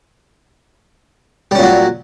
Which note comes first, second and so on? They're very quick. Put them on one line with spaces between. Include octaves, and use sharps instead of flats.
G3 C#4 A#2 F#3